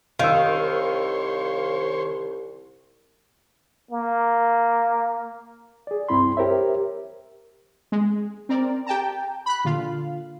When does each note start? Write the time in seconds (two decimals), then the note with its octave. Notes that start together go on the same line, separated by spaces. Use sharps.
0.19 C2 D#3 C5 C#5 F5 E6
3.91 A#3
5.87 G#4 D5
6.09 C2 G2 C4 E4 B5 C6
6.37 G4 A#4 C5 C#5 E5
7.92 G#3
8.49 C4 A#4 D5
8.86 G4 G5 A5 A#5
9.46 B5 F#6
9.64 A#2 D3 F4 F5